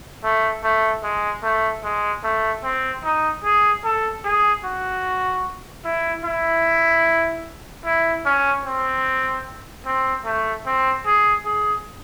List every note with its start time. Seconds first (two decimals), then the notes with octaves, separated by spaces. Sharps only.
0.24 A3
0.64 A3
1.04 G#3
1.44 A3
1.84 G#3
2.24 A3
2.64 C4
3.04 D#4
3.44 G#4
3.85 A4
4.25 G#4
4.64 F#4
5.85 E4
6.25 E4
7.85 E4
8.25 C#4
8.65 C4
9.86 C4
10.25 A3
10.66 C4
11.06 G#4
11.46 G#4